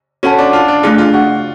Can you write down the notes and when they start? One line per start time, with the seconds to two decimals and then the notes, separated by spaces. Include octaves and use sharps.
0.23 C#4 F#4 A4 C#5 F#5 A5
0.38 D4
0.53 F4
0.68 D4
0.83 A3 D4 F4 G#4
0.98 F4
1.14 F#4